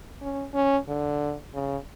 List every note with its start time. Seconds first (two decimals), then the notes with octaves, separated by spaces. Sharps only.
0.22 C#4
0.54 C#4
0.88 D3
1.54 C#3